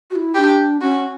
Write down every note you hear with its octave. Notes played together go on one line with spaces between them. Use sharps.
F#4
E4
D4 E4 G4
C#4 F#4